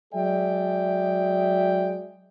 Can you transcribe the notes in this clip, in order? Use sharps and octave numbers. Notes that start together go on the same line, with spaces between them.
F#3 G#3 G#4 D5 E5 G5